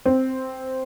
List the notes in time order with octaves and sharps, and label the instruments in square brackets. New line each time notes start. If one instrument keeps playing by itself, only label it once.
[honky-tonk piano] C4